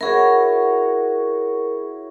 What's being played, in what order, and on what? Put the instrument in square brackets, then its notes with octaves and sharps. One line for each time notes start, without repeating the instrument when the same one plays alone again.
[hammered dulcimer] E4 F#4 C#5 [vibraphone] G#4 A#4